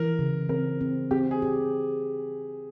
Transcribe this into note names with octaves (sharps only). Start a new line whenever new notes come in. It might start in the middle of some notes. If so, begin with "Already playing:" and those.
Already playing: E3 A#4
C#3
C4 A#4
C4
C4 G4
G#4
G4